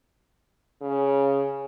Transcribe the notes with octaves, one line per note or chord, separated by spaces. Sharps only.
C#3